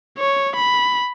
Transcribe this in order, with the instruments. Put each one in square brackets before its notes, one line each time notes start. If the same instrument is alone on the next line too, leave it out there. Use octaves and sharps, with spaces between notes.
[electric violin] C#5
B5